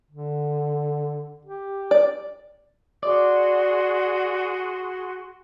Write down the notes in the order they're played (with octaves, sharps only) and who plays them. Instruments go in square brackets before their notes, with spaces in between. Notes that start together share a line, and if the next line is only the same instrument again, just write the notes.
[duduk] D3
G4
[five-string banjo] D5
[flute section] F#4 G#4 C6 [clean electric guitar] D5